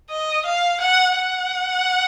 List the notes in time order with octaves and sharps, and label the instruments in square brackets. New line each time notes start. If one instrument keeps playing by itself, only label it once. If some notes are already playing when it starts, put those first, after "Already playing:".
[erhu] D#5
F5
F#5
F#5